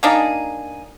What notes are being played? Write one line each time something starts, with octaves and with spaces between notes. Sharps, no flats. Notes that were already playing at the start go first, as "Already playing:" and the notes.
A#3 D4 D#4 G#4